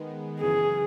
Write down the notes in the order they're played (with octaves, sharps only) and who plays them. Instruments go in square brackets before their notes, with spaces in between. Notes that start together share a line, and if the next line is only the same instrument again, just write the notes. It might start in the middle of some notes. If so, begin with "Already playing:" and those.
Already playing: [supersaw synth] D#3 G#3 B3
[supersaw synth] F#2 C#3 E3 [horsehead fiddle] G#4